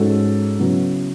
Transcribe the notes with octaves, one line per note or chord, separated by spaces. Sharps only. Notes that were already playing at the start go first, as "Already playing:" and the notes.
Already playing: G#2 G#3 C#4 F#4 A4
C#3 F#3 B3 E4